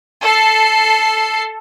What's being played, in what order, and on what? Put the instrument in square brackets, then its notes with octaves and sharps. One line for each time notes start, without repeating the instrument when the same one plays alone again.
[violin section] A4 C7